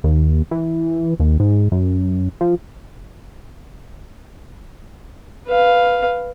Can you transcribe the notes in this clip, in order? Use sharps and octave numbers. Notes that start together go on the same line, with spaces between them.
D#2
E3
D#2
G#2
F#2
F3
B4 F5